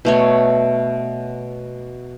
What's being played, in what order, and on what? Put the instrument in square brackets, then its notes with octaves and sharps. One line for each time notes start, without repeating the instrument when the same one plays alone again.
[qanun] B2 A3 C#5